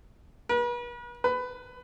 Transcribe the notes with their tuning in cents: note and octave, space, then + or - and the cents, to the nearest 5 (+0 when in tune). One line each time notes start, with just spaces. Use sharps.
B4 -40
B4 +20